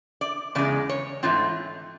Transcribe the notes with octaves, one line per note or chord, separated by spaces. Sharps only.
D5
E2 C#3 G#3 D5
C#5
G#2 E3 A3 C4 F4